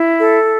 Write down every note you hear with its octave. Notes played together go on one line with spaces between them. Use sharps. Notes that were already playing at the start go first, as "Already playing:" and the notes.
Already playing: E4
A4